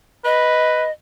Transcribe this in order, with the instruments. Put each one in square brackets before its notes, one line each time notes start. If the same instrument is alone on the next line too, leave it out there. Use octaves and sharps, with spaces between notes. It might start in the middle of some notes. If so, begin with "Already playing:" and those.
[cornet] B4 [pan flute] D#5